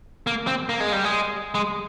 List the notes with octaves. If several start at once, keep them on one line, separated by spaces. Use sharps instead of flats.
A#3
C4
A#3
G#3
G3
G#3
G#3